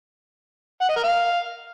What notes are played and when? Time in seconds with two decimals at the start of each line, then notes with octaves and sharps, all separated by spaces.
0.81 F#5
0.89 D#5
0.96 A#4
1.04 F5